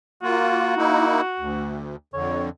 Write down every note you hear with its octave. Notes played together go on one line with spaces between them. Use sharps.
A#3 F4 F#4
A#3 D#4 E4
D2
F2 D3 C#5